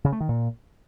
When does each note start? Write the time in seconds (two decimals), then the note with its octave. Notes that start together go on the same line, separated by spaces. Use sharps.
0.04 C#3
0.12 A3
0.20 D#3
0.29 A#2